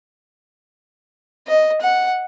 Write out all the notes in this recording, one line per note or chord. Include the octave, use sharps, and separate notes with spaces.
D#5
F#5